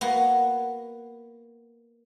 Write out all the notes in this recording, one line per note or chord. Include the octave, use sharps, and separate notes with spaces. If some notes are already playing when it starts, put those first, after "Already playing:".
A#3 B3 F#4